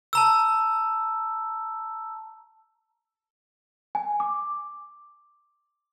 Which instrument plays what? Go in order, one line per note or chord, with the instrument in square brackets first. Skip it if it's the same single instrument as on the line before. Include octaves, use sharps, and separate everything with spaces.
[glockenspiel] A5 A#5 E6
[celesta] G#5
D6